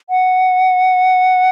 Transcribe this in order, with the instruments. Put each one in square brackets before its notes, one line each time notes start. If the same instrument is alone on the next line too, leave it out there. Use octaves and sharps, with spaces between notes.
[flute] F#5